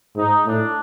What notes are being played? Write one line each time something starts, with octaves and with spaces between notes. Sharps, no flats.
G#2 D#4
A2 D4